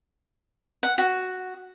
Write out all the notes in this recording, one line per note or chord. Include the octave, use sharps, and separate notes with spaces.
F#5
F#4